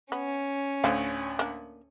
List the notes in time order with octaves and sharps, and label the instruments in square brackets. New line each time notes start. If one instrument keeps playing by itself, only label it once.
[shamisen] B3 [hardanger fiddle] C#4
[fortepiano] D2 A2 D3 [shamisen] C5 F5
[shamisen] A#3 D4